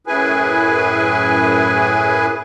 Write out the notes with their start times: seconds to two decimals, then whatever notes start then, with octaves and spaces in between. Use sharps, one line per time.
0.07 F#2 A2 E4 G#4 B4 G#5